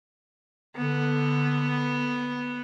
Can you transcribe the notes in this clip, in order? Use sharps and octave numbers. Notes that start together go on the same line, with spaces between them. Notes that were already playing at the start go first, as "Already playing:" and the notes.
D3 B3